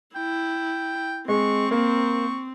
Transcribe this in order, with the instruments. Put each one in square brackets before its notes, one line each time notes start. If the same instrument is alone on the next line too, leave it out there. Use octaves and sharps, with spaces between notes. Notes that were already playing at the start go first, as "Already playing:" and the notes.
[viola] E4 [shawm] G5
[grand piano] G#3 [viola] C4 [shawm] C#6
[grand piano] A#3 [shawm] C#6